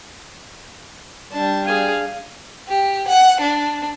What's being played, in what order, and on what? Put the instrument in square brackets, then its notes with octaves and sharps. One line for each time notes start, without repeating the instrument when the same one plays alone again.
[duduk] G3 [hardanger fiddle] D4 A5
[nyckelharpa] G#4 G#5 [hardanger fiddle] F5
[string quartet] G4
F#5
D4